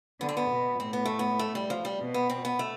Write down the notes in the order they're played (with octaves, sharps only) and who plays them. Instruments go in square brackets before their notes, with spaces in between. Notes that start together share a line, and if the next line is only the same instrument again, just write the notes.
[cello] D3 [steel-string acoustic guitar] B3
[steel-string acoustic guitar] C4
B3
[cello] B2
[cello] A2 [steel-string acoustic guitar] C4
[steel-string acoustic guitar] B3
A3
B3
A3
G3
F3
G3
[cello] B2
[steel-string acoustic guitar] B3
C4
B3
A3